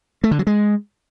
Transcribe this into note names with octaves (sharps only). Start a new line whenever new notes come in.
A3
D3
F#3
G#3